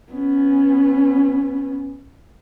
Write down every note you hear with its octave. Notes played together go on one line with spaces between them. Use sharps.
B3 C#4